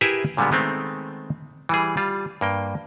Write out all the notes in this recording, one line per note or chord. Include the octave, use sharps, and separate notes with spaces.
E4 G4 G#4 A#4 B4 E5
A#2 D3 G3 G#3 B3
D#3 G#3 A3 B3 C4
E3 G3 G#4
G3 F4
G2 A#3 G5